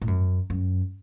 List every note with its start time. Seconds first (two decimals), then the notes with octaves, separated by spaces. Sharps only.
0.02 A2
0.08 F#2
0.50 F#2